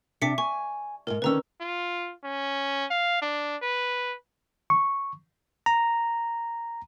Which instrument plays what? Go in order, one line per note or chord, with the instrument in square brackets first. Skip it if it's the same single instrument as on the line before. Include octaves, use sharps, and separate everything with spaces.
[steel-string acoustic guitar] C3 D4 [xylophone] D6 B6 C#7
[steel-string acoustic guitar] G#5 [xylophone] C#6
[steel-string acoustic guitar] D#2 G#2 [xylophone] A#4
[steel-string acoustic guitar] D3 D#3 C#4 [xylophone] B4 A#5 E6
[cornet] F4
C#4
F5
D4
B4
[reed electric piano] C#6
[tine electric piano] A#5